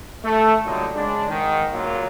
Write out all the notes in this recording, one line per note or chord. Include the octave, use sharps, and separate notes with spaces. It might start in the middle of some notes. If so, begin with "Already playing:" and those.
A3
A#2 D3 F#3 G3 D#4
C#3 G#3 D4
G#2 D#3
C#2 A#2 F#3 A#3 F4